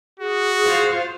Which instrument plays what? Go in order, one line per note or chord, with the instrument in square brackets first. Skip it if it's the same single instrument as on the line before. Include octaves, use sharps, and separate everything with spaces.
[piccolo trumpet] F#4 [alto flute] G#4
[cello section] F4 C5 F5